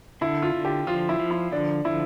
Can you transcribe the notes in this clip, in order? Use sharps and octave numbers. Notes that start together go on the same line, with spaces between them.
D3 E4
F4
D3
G4
F3 F4
E4
F3
E4
D3 D4
F3 E4